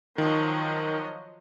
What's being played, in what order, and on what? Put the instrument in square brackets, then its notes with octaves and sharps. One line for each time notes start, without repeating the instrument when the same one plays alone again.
[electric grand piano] D#3 [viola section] F3 F#3 D#5